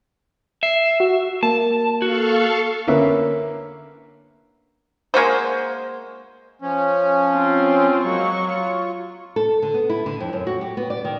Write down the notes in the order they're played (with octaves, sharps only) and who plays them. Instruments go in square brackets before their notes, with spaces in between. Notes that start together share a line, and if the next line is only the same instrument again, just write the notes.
[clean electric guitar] E5 [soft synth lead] C7
[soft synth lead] F#4
[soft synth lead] A#3 [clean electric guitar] A5
[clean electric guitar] F#4 [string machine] A4 F5 C#6
[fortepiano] D3 A#3 C#4 B4 E5
[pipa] G#3 A#3 F#4 C5
[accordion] F3 C#4
[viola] C4 F4
[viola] F#3 C#6 [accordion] G#3 A#3
[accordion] F4
[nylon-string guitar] A4
D3
B3
E4
D3
F2
F#2
F#4
G4
B3
D5
D#3